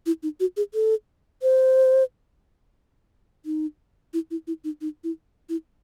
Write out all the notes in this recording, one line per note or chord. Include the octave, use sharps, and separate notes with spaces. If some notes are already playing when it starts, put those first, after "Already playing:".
E4
D#4
F#4
G#4
A4
C5
D#4
E4
E4
E4
D#4
D#4
E4
E4